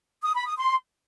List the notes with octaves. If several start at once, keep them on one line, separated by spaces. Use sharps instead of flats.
D#6
B5
D#6
C6